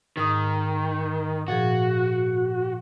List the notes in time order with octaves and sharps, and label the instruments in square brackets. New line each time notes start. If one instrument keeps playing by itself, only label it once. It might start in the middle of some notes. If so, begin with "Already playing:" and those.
[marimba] G#2 D#6 [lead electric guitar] D#3
[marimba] A#2 F3 G#4 [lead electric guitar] F#4